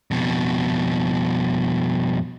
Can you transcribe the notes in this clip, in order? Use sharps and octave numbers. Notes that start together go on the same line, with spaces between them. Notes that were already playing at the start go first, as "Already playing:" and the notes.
F2 B2